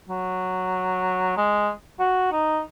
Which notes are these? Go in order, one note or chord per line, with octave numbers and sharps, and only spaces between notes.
F#3
G#3
F#4
D#4